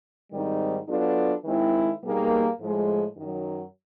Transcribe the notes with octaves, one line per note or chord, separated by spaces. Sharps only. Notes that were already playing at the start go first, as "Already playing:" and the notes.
G#2 D#3 G3 C4 D#4
F#3 B3 D4 F4 A4
D#3 G#3 C4 E4
B2 G3 A#3 D#4 G#4
A2 F3 G#3
F#2 D#3 F#3